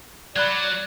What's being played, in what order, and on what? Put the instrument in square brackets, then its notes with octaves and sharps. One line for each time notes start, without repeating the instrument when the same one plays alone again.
[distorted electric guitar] F#3 [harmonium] D5 [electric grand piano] B5 F#6 G#6